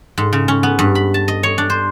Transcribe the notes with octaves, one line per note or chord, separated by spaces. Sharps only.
G#2
C#3
C#4
B3
G2
B5
A5
D#5
C#5
D4
C5